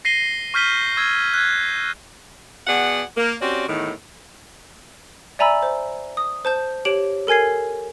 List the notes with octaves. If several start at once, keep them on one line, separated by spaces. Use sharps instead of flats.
A#6 C7 D#7 G7
C#6 F6 G6 B6 D#7 G7
C#6 E6 G#6
F#6 G#6
B2 F#4 G#4 D5 F#5
A#3
C4 C#4 F#4 G4 D5
E2 A2 D#3
D5 E5 G#5 A#5 B5 E6
C5
D#6
C5 A5 G6
G4 C#5 D7 F#7
A4 A#4 G#5 G#6 C7